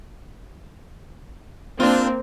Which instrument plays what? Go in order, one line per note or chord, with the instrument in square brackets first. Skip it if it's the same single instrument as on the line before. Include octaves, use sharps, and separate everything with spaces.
[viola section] A#3 C4 [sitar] D4 F4